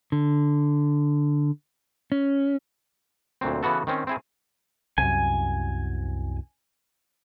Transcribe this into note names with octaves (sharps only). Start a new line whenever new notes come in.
D3
C#4
D2 A#2 F#3 C4
C#3 E3 B3 F#4 A4
D#3 C4 C#4
C4 E4 G#4
C2 F#2 G#5